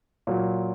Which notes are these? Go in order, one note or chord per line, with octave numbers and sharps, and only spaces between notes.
A#2 F#3